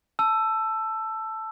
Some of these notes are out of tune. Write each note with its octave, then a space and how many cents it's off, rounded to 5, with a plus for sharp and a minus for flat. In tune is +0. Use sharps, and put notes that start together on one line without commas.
A5 +0 E6 +15